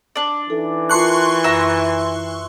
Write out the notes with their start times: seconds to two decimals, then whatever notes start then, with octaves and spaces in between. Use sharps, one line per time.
0.16 D4 D5
0.50 E3 D#4 A4
0.89 F4 A#4 A5 C6 C#6 F#6
1.44 F#2 E5 A#5